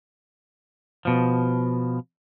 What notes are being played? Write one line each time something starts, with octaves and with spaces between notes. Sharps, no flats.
B2 F3